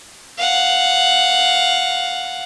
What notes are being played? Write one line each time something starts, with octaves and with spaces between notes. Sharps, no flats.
F5 F#5